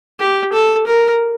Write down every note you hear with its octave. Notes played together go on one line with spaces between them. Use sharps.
G4
A4
A#4